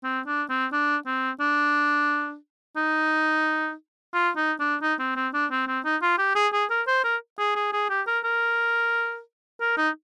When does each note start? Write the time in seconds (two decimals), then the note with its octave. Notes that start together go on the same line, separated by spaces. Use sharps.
0.04 C4
0.26 D4
0.50 C4
0.72 D4
1.06 C4
1.40 D4
2.77 D#4
4.14 F4
4.36 D#4
4.59 D4
4.82 D#4
4.99 C4
5.16 C4
5.34 D4
5.51 C4
5.68 C4
5.85 D#4
6.02 F4
6.18 G4
6.35 G#4
6.53 G#4
6.70 A#4
6.87 C5
7.04 A#4
7.39 G#4
7.56 G#4
7.73 G#4
7.90 G4
8.07 A#4
8.24 A#4
9.61 A#4
9.77 D#4